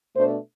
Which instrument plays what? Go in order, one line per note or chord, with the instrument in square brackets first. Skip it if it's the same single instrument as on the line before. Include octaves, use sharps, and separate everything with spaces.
[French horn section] B2 A3 D4 C5